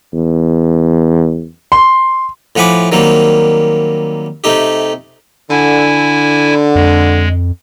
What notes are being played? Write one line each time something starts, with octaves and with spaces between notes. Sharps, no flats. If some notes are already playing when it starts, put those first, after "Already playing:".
E2
C6
A2 F3 F#5 G#5 B5 D6
D#3 F#3 G3 A#3 C4
C3 A3 D#4 G4
D3 E4 G#5
F2 G#3